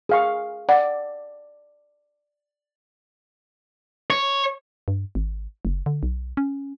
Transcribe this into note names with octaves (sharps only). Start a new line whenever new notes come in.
G#4 F5 C#6
D5 F#5
C#5
G2
G#1
F#1
D3
B1
C#4